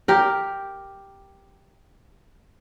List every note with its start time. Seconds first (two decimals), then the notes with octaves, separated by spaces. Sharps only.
0.08 G4 A#4